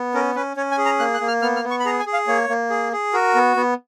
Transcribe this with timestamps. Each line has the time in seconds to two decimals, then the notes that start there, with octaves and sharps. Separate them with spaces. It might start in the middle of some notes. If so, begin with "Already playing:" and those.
Already playing: B3
0.14 C#4 A#4
0.35 C#4 B4
0.57 C#4 C#5
0.71 G#5
0.78 G#4
0.85 A#5
0.99 A#3 F#6
1.14 F#6
1.21 A#3
1.28 F6
1.42 B3 F6
1.56 F6
1.64 B3
1.71 C#6
1.80 B5
1.85 G#4 A#5
1.99 G#5
2.06 G#4
2.13 F5
2.28 A#3 C#5
2.49 A#3
2.70 G#4
2.92 G#4
3.13 F#4 A#4
3.35 B3
3.56 B3